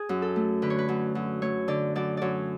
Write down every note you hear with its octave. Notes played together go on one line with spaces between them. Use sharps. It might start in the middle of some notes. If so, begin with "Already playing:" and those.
Already playing: G#4
F#2
A4
A3
D3 B4
C#5
B4
F#2
F#2
A3 C#5
D3 D5
F#2 D5
F#2 C#5 D5